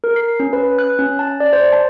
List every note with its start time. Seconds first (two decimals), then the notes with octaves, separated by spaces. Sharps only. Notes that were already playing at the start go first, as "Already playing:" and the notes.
0.04 A#4
0.16 C7
0.40 C#4
0.53 B4
0.79 F#6
0.99 C#4
1.19 A5
1.40 D5
1.53 C5
1.72 A5